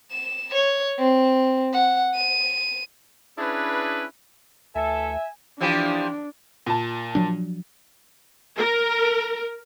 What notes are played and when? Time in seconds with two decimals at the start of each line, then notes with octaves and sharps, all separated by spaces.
0.11 E7
0.54 C#5
0.99 C4
1.73 F#5
2.14 D#7
3.38 C#4 D4 E4 G#4 B4
4.75 D2 E3 A4 E5 G#5
5.61 E3 F3 D4 G4
6.66 A#2 A5
7.15 F3 F#3 D4
8.58 A#4